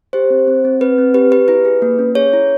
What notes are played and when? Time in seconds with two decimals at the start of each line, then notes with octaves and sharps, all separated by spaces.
0.13 G4 C5
0.30 C4
0.48 C4
0.65 C4
0.81 C4 B4
0.98 C4
1.14 G4 B4
1.32 G4 B4
1.48 E4 B4
1.65 G#4
1.82 A#3
1.99 C#4
2.15 G#4 C#5
2.33 E4